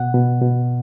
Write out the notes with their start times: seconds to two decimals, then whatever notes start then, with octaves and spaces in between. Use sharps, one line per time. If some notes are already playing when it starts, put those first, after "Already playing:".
Already playing: B2 F#5
0.14 B2
0.42 B2